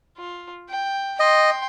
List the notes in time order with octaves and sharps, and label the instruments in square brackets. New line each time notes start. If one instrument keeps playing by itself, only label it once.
[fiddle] F4
G5
[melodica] D#5 [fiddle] G5 C6